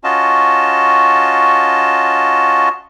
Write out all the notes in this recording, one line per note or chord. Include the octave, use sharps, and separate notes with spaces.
C#4 F4 F#4 D#5 A5